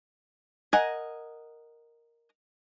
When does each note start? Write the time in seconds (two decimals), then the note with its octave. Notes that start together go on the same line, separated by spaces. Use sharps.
0.73 A#4 D#5 F#5 G#5